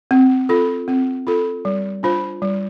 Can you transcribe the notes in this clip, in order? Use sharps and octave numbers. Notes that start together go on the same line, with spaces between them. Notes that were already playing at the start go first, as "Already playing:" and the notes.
C4
F4 A4
C4
F4 A4
G3
D4 F4 C5
G3